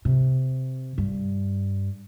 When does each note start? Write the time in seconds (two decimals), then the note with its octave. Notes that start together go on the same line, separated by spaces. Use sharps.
0.05 C3
0.98 G2